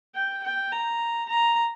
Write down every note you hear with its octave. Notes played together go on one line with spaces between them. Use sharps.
G5
G5
A#5
A#5